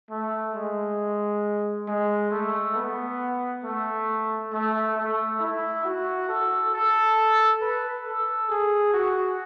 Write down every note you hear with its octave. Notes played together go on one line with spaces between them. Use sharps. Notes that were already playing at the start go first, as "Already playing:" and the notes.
A3
G#3
G#3
A3
B3
A3
A3
A3
E4
F#4
A4
A4
B4
A4
G#4
F#4